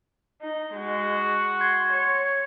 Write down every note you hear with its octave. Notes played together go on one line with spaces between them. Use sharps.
D#4
G#3 F#4
C6 G#6
C#5